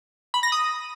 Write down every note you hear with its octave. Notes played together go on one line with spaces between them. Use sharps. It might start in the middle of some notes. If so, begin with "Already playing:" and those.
B5
A#6
D#6